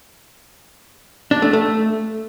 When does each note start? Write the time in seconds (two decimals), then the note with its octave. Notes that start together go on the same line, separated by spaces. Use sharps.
1.31 D4
1.42 A3
1.53 A3